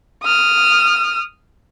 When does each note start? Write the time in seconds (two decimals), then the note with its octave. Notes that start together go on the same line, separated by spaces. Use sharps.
0.24 D#6 F6